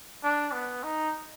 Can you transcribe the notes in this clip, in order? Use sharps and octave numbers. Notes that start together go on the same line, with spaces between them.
D4
B3
D#4